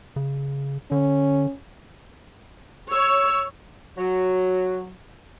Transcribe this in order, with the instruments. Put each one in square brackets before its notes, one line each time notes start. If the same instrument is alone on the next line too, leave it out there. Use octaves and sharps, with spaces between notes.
[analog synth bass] C#3
[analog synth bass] D3 [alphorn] C#4
[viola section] C#5 [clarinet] E6
[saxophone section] F#3